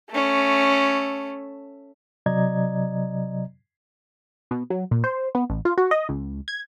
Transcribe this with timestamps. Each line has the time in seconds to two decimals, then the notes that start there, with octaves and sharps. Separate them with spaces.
0.10 A3 C#4
2.26 C3 F#3 D5 D#5 A#5 G#6
4.51 B2
4.70 F#3
4.91 A#2
5.04 C5
5.35 B3
5.50 A1
5.65 F4
5.78 F#4
5.91 D#5
6.09 C#2
6.48 G#6